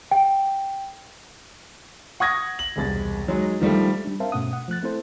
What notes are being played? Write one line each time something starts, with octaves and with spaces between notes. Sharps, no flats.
G5
F#5 C#6 D#6 G#6 A#6
F#7
E1 C2 A6
F#3 G#3 D#4
D#3 F3 G3 A3
G3 D4
C4 A#4 C5 E5 F5 A5
G2 B2 A3 C#4 F#5 D#6
F#5
F3 A3 F#6 A6
A3 C4 E4 A4 C5